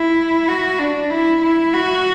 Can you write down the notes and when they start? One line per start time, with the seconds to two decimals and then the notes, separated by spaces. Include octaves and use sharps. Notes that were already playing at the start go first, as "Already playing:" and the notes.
Already playing: E4
0.48 F#4
0.79 D4
1.10 E4
1.42 E4
1.74 F#4